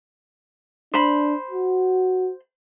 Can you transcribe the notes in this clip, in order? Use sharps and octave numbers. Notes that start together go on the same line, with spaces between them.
D4 C5 B5
F#4